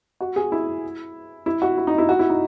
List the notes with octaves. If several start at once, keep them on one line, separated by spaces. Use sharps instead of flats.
F#4
G#4
E4
E4
F#4
E4
D#4
E4
F#4
E4
D#4